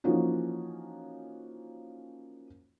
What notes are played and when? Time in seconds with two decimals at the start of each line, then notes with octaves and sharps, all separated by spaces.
0.04 E3 F3 A#3 C#4 D#4 F#4